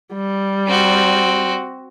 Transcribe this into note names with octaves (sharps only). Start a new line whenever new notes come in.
G3
C4 F#4